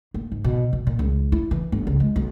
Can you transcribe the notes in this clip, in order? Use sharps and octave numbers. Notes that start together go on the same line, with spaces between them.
A#3
G#2
B2
B2
A#2
C#2
E4
E3
G1
C#2
G#3
B1